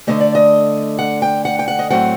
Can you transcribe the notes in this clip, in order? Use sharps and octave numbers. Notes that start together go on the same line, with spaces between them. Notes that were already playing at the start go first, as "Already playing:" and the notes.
D2 D3 F#3 A3 D#5
D5
D#5
F#5
G5
F#5
G5
F#5
D#5
A2 F#3 A3 C4 F#5